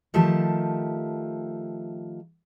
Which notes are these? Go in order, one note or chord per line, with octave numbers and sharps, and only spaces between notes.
D#3 F3 A3 G4 A5